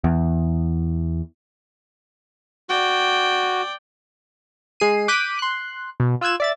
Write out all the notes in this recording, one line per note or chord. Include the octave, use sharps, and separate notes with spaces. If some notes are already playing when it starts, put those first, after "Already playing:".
E2
F#4 D5 G5
G#3 G#4 C7 D#7
D6 F#6 G6 B6 D7 D#7
C6 F#6
B2
F4 E6 F#6 G#6 E7
D5 E5 A6